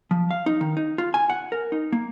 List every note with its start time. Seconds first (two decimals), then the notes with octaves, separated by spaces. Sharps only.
0.11 F3
0.31 F5
0.46 D#4
0.61 D#3
0.77 D#4
0.98 F4
1.14 G#5
1.30 F#5
1.52 A#4
1.72 D#4
1.92 A#3